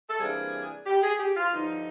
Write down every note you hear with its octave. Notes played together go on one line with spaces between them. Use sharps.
A4
C3 E3 G3 A#3 D4 G#4
G4
G#4
G4
F4
G2 D3 F3 D#4